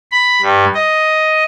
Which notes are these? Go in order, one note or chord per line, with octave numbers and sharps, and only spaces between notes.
B5
G2
D#5